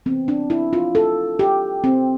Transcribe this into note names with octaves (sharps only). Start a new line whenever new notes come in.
C3 E3 B3 C4
D4
E4
F4
A4
G4
C4